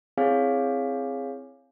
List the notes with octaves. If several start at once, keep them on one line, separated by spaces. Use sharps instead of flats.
C4 E4 G#4 C#5 F5 G#5